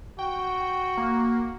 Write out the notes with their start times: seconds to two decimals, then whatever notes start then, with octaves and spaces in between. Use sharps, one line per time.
0.19 F#4 G5
0.98 A#3